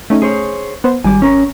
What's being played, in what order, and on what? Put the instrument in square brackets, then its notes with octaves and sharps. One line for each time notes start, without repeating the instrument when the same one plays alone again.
[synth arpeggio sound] A3 C#4 D#4
[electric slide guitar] G#4 C5 C#5
[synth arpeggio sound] B3 C5
[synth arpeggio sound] G#1 D6 [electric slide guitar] G3 G#5
[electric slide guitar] C#4 A#4